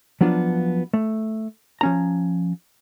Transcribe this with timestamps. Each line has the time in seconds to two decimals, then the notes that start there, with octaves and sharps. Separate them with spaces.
0.21 F3 F#3 B3 D4 F4
0.93 A3
1.81 F3 C#4 A#5